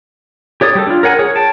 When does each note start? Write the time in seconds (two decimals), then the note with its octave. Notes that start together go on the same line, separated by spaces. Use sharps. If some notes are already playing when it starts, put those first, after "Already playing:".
0.61 G4 C#5 D5 D#6
0.75 G3 G4 A4
0.87 D4 F4
1.03 A#4 C#5 F#5 G#5
1.19 G#4 C#5
1.36 G5 A5